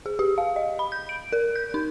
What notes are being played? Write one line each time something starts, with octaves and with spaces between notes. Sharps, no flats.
G#4
G4
F5
D#5
B5
G6
D7
A#4
G6
D#4